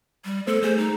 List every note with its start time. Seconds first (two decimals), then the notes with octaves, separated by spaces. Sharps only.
0.25 G3
0.47 A3 B3 A4 C5
0.63 A3 G#4 C5
0.78 D#4